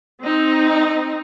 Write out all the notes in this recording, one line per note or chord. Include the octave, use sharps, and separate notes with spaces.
C4 D#4